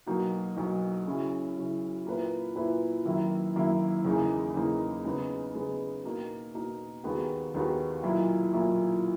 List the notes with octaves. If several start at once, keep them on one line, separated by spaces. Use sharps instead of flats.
B1 B2 A#3 D#4 F#4
B1 B2 A#3 D#4 F#4
C#3 F#3 C#4 E4
C#3 F#3 C#4 E4
A#2 A#3 E4 B4
A#2 A#3 E4 B4
F#2 D#3 A#3 E4
F#2 D#3 A#3 E4
E2 C#3 E3 A#3 D#4
E2 C#3 E3 A#3 D#4
C#3 G#3 B3 D#4
C#3 G#3 B3 D#4
B2 A#3 D#4 A#4
B2 A#3 D#4 A#4
D#2 D#3 G#3 B3 F#4
D#2 D#3 G#3 B3 F#4
B1 A#2 A#3 E4
B1 A#2 A#3 E4